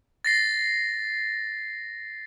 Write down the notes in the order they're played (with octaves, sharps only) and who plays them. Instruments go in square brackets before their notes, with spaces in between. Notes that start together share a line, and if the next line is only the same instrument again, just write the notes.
[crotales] A6 A#6 C7